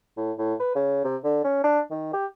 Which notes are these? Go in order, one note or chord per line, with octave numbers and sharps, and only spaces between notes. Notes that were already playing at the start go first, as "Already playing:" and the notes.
A2
A2
B4
C#3
C3
D3
C#4
D4
D#3
G4